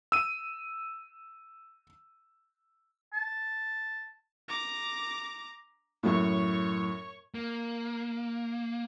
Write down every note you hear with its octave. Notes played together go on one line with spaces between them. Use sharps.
E6 D#7
A5
A#5 D6
F#2 A2 C#5 C#6
A#3